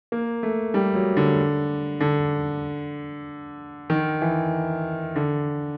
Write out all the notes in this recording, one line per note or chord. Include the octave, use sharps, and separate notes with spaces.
A#3
A3
G3
F#3
D3
D3
D#3
E3
D3